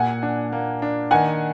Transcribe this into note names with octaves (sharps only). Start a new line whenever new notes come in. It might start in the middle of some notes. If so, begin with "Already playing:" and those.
Already playing: A#2 F#5 G#5
D4
A#3
D4
D#3 F#5 G#5